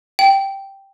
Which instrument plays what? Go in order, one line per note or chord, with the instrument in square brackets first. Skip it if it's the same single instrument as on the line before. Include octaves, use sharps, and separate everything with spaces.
[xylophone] G5